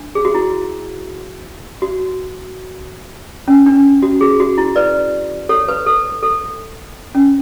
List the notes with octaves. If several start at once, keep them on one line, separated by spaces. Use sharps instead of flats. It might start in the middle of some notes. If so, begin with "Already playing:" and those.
Already playing: D4
G#4
F#4
E4
F#4
C#4
D4
F#4
G#4
F#4
E4
B4 D5
A4 C#5
B4
A4
A4
C#4